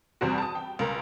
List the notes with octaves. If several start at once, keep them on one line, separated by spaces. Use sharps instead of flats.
E2 G3 C4 F#4
A5 D#6
G5
C#2 A#4